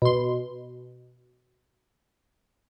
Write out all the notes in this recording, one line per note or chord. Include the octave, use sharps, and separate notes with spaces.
B2 C6